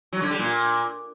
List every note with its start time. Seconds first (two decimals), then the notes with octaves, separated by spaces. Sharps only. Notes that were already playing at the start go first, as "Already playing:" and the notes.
0.13 F#3
0.21 D3
0.30 G3
0.39 A#2